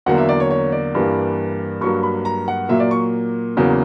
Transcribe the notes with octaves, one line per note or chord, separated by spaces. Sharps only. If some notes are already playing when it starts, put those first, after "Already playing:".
E2 D3 F#3 A#3 F#5
E5
D5
C#5
C#5
D5
G2 E3 G3 A#3
G2 F#3 A#3 C#6
B5
A#5
F#5
A#2 F#3 A#3 E5
D5
C#6
E2 C#3 F#3 A#3